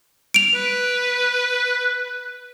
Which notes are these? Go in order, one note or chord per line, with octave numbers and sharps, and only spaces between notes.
D7 F7
B4